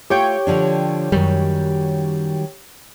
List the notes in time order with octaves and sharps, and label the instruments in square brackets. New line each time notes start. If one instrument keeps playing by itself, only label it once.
[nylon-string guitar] A3 F4 [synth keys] G4 C#5 G5
[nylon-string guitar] D3 F3 D4
[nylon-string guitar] F#2 [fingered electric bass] D#3 F#3 G3